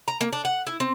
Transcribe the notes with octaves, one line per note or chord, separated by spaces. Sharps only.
A#5
A#3
D4
F#5
E4
C4